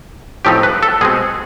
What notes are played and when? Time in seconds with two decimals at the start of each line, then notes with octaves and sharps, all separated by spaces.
0.45 A2 F3 A3 C4 D#4 G4
0.63 B4
0.83 A4
1.01 B2 G#3 C4 G#4